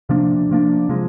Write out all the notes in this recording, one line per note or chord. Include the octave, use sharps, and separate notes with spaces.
C3 F3 A#3 D4
C3 F3 A#3 D4
C3 F3 G#3